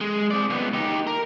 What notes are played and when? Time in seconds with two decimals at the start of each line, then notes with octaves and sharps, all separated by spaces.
0.01 G#3
0.31 C4 D5
0.50 C#2 B3
0.74 D#4 G4
1.07 A#4